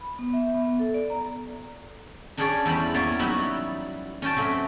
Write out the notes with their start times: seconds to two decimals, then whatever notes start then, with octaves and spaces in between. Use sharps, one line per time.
0.01 B5
0.19 B3
0.33 E5
0.54 B3
0.79 A4
0.94 D5
1.10 A#5
2.37 C#4 D4 G4 G#4 C#5 D5
2.65 E2 G3 C5 B5
2.94 A#3 B3 C#4 C#5 D5
3.19 F#3 G3 B3 D#4 E4 F#4
4.22 C#4 C#5 G5 A5
4.36 C3 F#3 A3